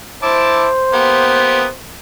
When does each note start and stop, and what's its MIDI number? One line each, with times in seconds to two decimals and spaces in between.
0.23 0.66 64
0.23 1.74 72
0.23 0.66 81
0.23 0.66 86
0.93 1.64 58
0.93 1.64 59
0.93 1.64 67